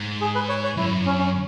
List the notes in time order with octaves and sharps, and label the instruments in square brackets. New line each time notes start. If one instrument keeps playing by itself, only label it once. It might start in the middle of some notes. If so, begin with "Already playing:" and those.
Already playing: [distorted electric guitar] G#2
[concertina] G#4
B4
C#5
C#5
[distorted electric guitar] F#2 [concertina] E4
[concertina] C#4
C#4